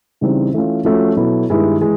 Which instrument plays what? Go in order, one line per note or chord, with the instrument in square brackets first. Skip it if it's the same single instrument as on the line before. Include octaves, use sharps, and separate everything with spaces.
[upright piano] C#3 E3 G3 C4 D#4
E3 A3 C#4 F4
F3 A3 C#4 F#4
B2 F#3 B3 E4 A4
G2 D#3 G#3 B3 E4
E3 G#3